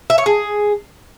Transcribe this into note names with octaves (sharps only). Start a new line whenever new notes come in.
E5
C#5
G#4